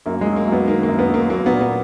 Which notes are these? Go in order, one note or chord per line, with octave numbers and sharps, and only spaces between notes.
F#2 A#3
G#3
F#3
A#3
F#2 B3
D#3 A#3
A#3
F#2
B3
F#3 A#3
F#3 A#3
A#2 B3
B3